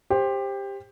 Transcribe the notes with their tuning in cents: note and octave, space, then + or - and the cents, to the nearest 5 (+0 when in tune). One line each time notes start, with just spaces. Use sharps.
G4 +15 C5 +15